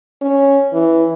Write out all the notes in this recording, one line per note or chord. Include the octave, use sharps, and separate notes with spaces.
C#4
E3